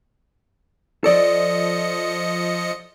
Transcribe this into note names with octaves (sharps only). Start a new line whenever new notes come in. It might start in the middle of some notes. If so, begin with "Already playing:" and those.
F3 A4 D5 D#5 C#7